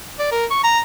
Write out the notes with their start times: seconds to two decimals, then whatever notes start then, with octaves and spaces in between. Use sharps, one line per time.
0.19 D5
0.32 A#4
0.51 C#6
0.64 A#5